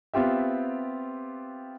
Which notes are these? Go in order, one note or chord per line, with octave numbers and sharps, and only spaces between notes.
B3 C4 F4 G4 E5